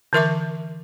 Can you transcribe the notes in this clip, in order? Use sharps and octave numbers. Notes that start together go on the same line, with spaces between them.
D3 E3 A#4 E5 C#6 D6